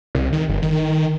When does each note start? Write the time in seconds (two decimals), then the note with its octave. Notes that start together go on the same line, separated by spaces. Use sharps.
0.15 C2
0.33 D#3
0.49 G1
0.62 D#3